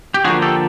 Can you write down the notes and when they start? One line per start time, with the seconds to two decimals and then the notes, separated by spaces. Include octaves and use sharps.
0.14 G4
0.24 D3 F3 A#3 F#4 G#4
0.42 G4 A4